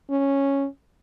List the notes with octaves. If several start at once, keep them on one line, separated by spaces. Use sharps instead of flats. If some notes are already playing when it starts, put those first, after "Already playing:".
C#4